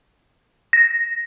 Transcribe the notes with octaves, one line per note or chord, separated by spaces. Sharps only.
A#6